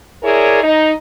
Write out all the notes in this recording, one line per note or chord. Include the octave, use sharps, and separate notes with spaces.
E4 G#4 A#4 C#5 D5
D#4